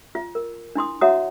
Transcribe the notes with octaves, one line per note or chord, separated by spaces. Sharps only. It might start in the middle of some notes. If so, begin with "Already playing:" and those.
F4
A#4
D4 E4 C6 D#6
F#4 C#5 E5 F#5 A#5 D#6